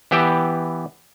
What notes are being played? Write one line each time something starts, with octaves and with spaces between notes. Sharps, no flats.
E3 B3 G4 E5 G5